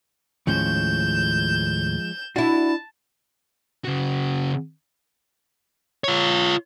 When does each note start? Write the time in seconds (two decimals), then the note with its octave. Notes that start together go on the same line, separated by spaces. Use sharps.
0.47 D#2 A2 F3 G#3 C#4 F4 G6 E7
2.36 D4 E4 F#4 A5
3.84 C#3 F#4
6.04 F4 C#5